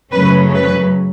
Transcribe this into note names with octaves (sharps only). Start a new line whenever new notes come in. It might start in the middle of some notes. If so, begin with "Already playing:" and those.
F#2 C#3 F#3 A3 C#4 B4
B4